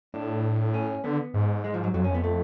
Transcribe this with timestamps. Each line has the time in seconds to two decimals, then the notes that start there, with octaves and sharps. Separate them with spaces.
0.14 A2 D4
0.74 C#4
1.04 D3 B3
1.34 G#2
1.64 G#3
1.74 F3
1.84 F#3
1.94 F2 F#3
2.02 F#2 C#4
2.10 F2 B3
2.24 A3